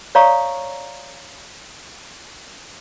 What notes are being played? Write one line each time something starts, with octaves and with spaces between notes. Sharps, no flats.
C#5 D5 F5 A#5 C#6 D#6